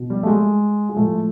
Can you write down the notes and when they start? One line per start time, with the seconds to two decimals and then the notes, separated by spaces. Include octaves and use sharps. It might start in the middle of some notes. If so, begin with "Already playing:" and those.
Already playing: B2
0.10 G3
0.23 A3
0.27 G#3
0.89 G#3
0.96 A2 F3 A3